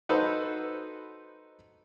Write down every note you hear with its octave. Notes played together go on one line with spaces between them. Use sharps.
D#4 F#4 A4 B4 C5